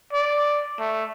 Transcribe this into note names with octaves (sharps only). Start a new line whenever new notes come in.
D5
A3